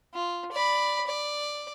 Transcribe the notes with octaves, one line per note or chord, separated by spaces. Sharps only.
F4
D5 B5
D5